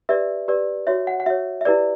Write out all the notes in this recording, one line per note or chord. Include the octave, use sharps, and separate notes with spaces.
G4 B4 D5 E5
G4 B4 D5
F#4 C#5 E5
F#5
F#5
F#4 C#5 E5
E5
E4 G4 B4 D5